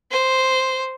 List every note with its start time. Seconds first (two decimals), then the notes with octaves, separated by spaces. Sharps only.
0.11 C5